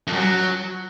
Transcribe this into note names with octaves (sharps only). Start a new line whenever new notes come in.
F2
F#2
F#3